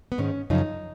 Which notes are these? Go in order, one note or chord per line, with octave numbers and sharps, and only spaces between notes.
B3
G#2 D#3 C#4
F#2 C#3 F3 D#4